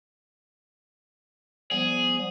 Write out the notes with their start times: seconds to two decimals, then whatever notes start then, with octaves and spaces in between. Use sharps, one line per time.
1.71 F3 G3 B3 G#4